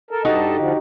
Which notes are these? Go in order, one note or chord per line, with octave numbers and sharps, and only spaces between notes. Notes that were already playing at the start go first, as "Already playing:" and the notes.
A4 A#4
G2 D#4 F#4 G4 A4 D#5
D3 F3